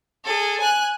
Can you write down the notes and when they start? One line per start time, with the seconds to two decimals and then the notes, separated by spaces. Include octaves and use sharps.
0.24 G#4 A4
0.60 G#5 F#6